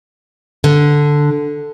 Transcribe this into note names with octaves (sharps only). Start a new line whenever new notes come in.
D3